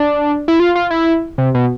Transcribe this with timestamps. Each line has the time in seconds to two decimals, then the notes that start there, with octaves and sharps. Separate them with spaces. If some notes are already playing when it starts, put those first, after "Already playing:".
Already playing: D4
0.48 E4
0.60 F4
0.75 F4
0.90 E4
1.38 C3
1.54 B2